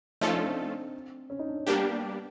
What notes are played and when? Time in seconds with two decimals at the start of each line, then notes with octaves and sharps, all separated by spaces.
0.21 F3 A3 C#4 D#4 F4 A4
0.34 D4
0.46 C4
1.30 C#4
1.39 D#4
1.48 D4
1.57 C#4
1.67 G3 A#3 B3 D4 G4